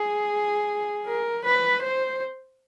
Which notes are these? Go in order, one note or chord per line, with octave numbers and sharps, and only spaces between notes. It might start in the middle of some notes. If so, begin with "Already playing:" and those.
Already playing: G#4
A#4
B4
C5